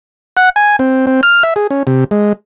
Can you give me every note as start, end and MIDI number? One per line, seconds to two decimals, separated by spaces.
0.37 0.49 78
0.56 0.76 80
0.79 1.06 60
1.07 1.21 60
1.23 1.43 89
1.43 1.54 76
1.56 1.67 68
1.70 1.83 61
1.87 2.04 48
2.11 2.33 56